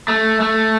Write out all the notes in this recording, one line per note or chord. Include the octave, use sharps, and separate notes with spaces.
A3
A3